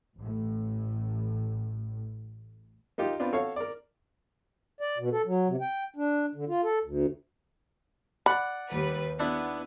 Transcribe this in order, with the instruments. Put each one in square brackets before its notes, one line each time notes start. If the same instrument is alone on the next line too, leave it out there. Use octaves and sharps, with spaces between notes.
[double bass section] A1 A2
[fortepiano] A#3 D#4 F4 G4
B3 C4 D4 F4
F#4 A4 C#5 F5
A#4 D5
[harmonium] D5
B2
A4
F#3
C3
G5
D4
D3
F4
A4
D2
[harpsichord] D5 F#5 [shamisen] B5
[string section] D#2 G3 B4
[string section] B3 [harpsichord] D4 E4